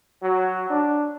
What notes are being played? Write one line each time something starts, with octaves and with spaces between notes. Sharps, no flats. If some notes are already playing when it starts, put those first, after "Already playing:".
F#3
D4